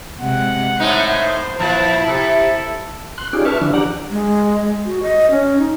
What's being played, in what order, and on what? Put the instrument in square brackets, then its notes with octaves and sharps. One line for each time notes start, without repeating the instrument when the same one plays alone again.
[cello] C3 G#3 [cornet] F#5
[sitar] A2 A3 D#4 [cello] C5
[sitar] A#2 F3 [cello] E4 [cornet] A5
[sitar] C3 [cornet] A4
[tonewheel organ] C6 F#6
C#4 D#4 F4 G4 G#4 D5
B4 E5 A5 C#6 F6
D3 F3 D4 E4
D4 G4 D5 F#5 A#5
[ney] G#3
F#4
D#5
C#4
D#4